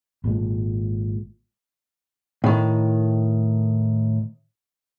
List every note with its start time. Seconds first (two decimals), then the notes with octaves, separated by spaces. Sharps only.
0.24 G#1 A#2 D#3 G#3
2.44 A2 D#3